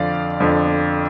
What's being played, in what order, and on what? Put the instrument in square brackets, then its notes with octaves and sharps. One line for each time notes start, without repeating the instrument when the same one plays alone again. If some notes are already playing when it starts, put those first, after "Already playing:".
Already playing: [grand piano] F2 D3 F3 D5 F5
F2 D3 F3